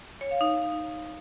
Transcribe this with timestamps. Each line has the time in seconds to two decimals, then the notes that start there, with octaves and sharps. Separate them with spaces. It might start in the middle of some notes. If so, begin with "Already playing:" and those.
0.21 C#5
0.31 F5
0.41 D#4